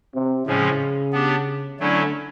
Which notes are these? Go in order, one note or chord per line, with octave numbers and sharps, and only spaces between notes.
C3
A2 C#3 F3 G#3 C#4
B3 D4 G4
D3 F#3 A3 C#4 E4